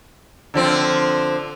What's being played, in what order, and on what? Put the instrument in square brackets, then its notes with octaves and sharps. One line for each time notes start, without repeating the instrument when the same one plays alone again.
[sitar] D3 F3 C4